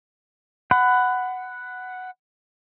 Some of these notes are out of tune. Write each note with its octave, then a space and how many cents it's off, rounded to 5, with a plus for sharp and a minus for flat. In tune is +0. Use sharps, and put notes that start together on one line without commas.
F#5 +0 B5 +20